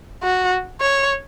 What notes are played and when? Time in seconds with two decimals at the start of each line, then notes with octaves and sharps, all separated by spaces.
0.23 F#4
0.81 C#5